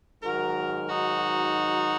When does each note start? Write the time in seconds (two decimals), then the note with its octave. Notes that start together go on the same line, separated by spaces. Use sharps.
0.23 G#2 D#3 F#3 F#4 A#4
0.90 D#4 F#4